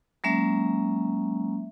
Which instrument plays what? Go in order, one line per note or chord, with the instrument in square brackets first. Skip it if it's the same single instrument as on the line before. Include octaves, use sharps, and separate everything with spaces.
[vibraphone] F#3 G#3 A#3 C#4 E5